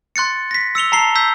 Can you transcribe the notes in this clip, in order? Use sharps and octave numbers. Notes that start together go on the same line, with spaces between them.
C6 F#6 A6 C#7
A#6 B6
E6 C#7 F7 G7
A5 A#5 C7 G7
E6 G6 B6